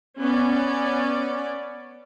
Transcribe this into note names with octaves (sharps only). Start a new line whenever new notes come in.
B3 C#4 D5